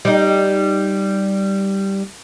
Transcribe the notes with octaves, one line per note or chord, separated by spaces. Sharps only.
G3 D#4